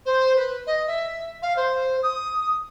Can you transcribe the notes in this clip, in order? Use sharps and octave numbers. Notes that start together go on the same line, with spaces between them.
C5
B4
D#5
E5
F5
C5
D#6